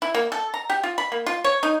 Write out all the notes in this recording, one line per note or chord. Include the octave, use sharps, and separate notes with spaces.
E4
A#3
A4
A#5
G4
F4
B5
A#3
F4
C#5
D#4